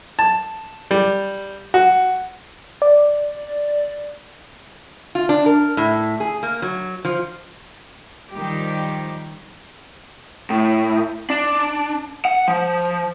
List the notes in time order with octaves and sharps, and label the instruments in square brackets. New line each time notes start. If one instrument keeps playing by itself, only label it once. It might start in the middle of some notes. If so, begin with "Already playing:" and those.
[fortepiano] A5
G3
F#4
[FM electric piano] D5
[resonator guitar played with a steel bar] F4
D4
A#4
A2
G#4
A#3
F#3
F3
[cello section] D#3 F3 G3 D#4 G4
[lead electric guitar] A2
D4
F#5
F3